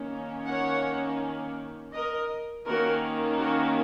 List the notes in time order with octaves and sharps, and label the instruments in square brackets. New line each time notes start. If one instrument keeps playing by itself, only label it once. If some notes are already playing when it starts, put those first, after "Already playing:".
Already playing: [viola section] D#3 A#3 C#4
C#5 F#5
A#4 D#5
D#3 A#3 C#4 F#4 A#4
F#4 A#4